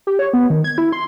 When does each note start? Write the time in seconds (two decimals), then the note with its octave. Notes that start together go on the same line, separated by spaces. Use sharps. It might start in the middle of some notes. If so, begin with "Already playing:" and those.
0.07 G4
0.19 C#5
0.33 B3
0.50 D#3
0.64 G#6
0.78 E4
0.93 C6